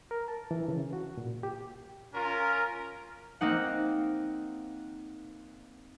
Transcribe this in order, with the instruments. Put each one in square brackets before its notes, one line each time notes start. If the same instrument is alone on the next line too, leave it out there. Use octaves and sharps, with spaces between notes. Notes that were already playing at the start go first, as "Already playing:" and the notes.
[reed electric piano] A#4
A5
E3
C#3
F#4
A#2
G4
[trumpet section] C#4 F4 A#4
[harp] A#3 C4 D#4 F#5